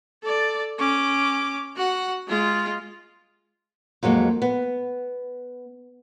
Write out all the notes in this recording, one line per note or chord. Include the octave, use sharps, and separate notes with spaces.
A4 D5
C#4 D6
F#4 F#5
G#3 F4
F2 F#3 G#3 A#3
B3